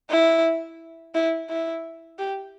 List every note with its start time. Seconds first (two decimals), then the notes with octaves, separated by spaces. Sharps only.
0.10 E4
1.15 E4
1.49 E4
2.19 G4